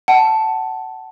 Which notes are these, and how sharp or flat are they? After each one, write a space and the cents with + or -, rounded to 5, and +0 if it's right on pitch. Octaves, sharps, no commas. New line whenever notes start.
F#5 +25 A5 +0